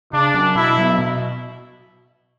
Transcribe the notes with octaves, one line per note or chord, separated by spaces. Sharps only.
C#3 D4
F#3 C#4
B2 E4
F#3 B3
B2